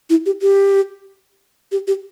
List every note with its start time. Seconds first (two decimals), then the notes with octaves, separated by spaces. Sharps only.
0.10 E4
0.26 G4
0.42 G4
1.72 G4
1.87 G4